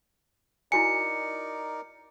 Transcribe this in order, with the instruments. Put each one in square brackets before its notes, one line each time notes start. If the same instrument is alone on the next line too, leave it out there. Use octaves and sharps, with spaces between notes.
[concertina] D#4 A#4 D5 [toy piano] E4 F#4 G#5 [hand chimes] C#7